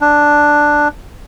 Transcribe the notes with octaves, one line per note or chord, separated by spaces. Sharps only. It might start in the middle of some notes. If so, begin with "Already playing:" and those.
D4